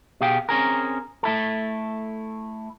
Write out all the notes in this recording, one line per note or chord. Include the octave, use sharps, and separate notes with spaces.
B2 G4 G#4 F5 G5
C4 C#4 G#4 A#4
A3 E4 A4